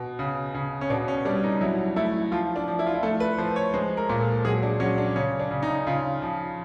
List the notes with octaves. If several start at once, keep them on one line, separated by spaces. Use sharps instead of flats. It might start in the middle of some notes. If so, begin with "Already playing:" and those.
Already playing: B2
C#3
C#3
C#4
B2 D4
C#4
G3 D4
D#4
F#3 E4
A3 E4
F3 F4
D4
F3
E4
F4
E4
A3 A4
B4
F3 C5
C#5
G#3 C5
A#4
A#2
A4
F#3 G#4
D4
F#3 C#4
D4
C#3 C#4
D4
C#3
D#4
C#3 F4
F3